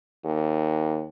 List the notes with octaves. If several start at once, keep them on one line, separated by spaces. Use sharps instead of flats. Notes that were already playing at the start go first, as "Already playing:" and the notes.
D#2